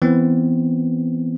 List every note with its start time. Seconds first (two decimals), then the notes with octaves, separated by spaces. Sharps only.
0.02 E3 B3 C4